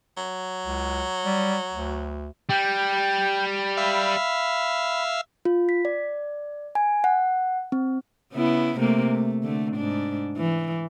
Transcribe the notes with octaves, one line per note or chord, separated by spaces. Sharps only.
F#3
C#2
G3
D2
G3 G5
E5 F5 B5
F4
B6
D5
G#5
F#5
C4
C#3 B3 E4
C3 A3 A#3
A3
D3 A3
G#2 D4
E3